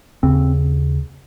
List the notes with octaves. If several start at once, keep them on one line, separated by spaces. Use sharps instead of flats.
D#2 C#3 C4